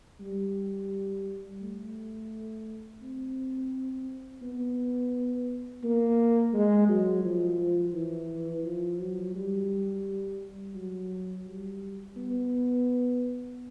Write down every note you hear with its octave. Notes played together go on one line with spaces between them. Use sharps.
G3
A3
C4
B3
A#3
G#3
F#3
F3
E3
F3
F#3
G3
F#3
G3
B3